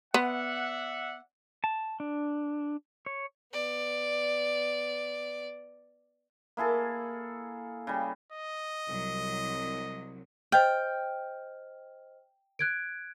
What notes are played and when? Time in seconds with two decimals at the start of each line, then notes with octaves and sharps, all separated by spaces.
0.14 B3 D5 E5 F#5
1.64 A5
2.00 D4
3.06 C#5
3.53 B3 D5
6.57 A#3 E4 G#4 A4
7.87 C#3 G3
8.32 D#5
8.87 C2 F#3
10.52 C5 D#5 G5 F6
12.59 F#6 G#6 D7